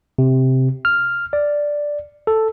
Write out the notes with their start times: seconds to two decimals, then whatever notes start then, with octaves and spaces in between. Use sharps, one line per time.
0.18 C3
0.85 F6
1.33 D5
2.27 A4